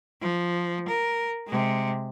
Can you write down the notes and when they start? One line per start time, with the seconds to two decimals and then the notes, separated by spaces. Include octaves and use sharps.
0.21 F3
0.88 A#4
1.47 C3 G#3